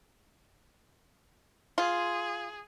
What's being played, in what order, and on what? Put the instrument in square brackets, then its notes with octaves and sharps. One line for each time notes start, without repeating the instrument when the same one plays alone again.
[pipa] F4 [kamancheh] G#4